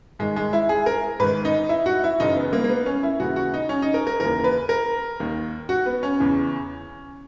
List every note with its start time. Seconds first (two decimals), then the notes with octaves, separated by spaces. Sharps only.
0.19 G#2 D#3 G#3
0.36 G#3
0.53 E4
0.69 G#4
0.86 A#4
1.20 G#2 D#3 B4
1.45 D#4
1.69 E4
1.86 F#4
2.04 E4
2.20 F#2 C#3 E3 D#4
2.36 B3
2.53 A#3
2.64 A#3
2.69 B3
2.86 C#4
3.03 E4
3.20 D#2 C#3 E3 F#4
3.36 F#4
3.54 D#4
3.69 C#4
3.82 D#4
3.94 A#4
4.07 A#4
4.20 D#2 C#3 E3 A#4
4.44 B4
4.69 A#4
5.20 D#2 D#3
5.69 F#4
5.86 B3
6.03 C#4
6.20 E2 C#3 E3